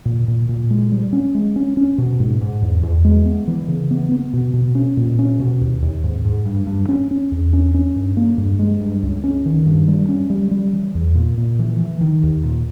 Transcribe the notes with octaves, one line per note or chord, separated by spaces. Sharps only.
A#2
A#2
A#2
G#3
G3
C#4
G#3
C#4
C#4
B2
G#2
G#2
E2
E2
G#3
B3
E3
C#3
B3
B3
B2
B2
C#4
A#2
C#4
B2
D#2
D#2
G#2
G#2
G2
G2
C#4
C#4
E2
C#4
C#4
G2
A#3
G2
G#3
G2
C#2
C#4
D#3
G2
G3
C#4
G3
G3
E3
E2
A#2
A#2
E3
E3
D#3
D#2
A#2